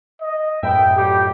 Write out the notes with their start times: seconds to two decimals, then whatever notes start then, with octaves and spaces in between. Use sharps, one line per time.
0.21 D#5
0.63 F#2 A2 B4 E5 G5
0.97 F3 G3 G4 G5